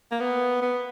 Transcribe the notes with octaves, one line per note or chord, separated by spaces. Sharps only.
A#3
B3
B3